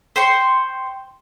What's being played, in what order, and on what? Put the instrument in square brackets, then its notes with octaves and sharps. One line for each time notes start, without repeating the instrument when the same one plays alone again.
[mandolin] C5 G5 C6 C#6